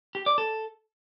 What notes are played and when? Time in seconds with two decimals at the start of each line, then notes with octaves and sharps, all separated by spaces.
0.15 G4
0.26 D5
0.38 A4